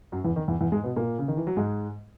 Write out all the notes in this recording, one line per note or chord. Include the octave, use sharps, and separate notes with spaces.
F#2 F#3
E2 E3
D#3
E2 E3
E2 E3
G#2 G#3
B2 B3
A#2 A#3
C#3
D#3
E3
F#3
G#2 G#3